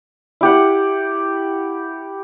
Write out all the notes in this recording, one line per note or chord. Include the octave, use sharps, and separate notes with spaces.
E4 G4 F#5